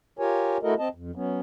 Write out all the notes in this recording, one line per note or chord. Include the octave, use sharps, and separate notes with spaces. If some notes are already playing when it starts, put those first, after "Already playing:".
F4 G4 A#4 C#5 G#5
A3 E4 F#4 A4 A#4 D#5
C4 D#5 A5
F2
F#3 B3 C#4